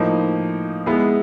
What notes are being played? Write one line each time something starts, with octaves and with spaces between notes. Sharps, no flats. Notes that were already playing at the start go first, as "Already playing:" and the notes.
Already playing: A2 F3 A#3 D#4
G#3 B3 E4 G#4